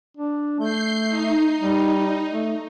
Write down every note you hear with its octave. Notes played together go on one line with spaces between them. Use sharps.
D4
A3 G6 C7
D#4
G3
A3